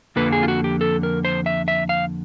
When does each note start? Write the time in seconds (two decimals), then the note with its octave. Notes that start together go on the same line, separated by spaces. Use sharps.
0.16 F2 D3 F3 A#3 B4
0.32 G#4
0.43 F4
0.48 F#4
0.64 G4
0.81 A4
1.03 A#4
1.25 C5
1.46 E5
1.68 E5
1.89 F5